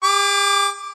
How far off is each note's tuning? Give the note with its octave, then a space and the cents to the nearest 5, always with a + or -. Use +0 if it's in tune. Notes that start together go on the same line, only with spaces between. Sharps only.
G4 +45 D6 +0